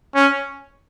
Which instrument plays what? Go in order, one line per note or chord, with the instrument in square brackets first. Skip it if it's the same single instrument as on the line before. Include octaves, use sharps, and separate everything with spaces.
[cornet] C#4